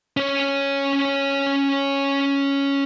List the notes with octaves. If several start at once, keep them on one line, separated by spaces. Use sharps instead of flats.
C#4 C#5